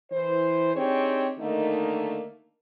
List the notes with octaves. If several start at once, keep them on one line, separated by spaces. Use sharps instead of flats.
E3 C5
C4 D4 D#4 G4 G#4 C#5
D3 D#3 A3 A#3 D#4